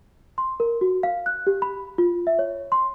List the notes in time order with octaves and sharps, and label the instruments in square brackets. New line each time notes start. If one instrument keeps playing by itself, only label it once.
[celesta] C6
A#4
F#4
F5
F#6
G4
B5
F4
E5
C#5
C6